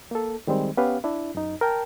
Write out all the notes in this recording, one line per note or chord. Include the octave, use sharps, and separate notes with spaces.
A#3 A4
D#3 G3 G#3 C4
B3 C#4 G4 B4 F5
D4 E4
F#2 D#4
A#4 G5 A5